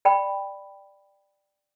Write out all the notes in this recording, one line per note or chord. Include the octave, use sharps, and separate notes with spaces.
D5 G5 B5